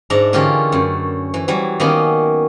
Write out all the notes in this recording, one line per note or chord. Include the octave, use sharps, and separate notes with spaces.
G#2 D4 E5 A#5
D3 E3 C#4 F4 G4 A#4
F#2 A3
E3
E3 F#3 G3
D#3 A#3 B3 C#4